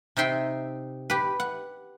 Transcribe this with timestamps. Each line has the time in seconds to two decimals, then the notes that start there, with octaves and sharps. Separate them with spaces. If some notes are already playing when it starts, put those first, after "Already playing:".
0.17 C3 D#4 E5 G5 C6
1.10 G4 B4
1.40 F#5